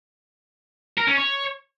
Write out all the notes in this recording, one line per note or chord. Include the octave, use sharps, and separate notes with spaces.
A#4
C#4
C#5